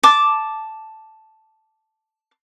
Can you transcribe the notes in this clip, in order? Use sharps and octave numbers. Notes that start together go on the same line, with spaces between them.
A5 D6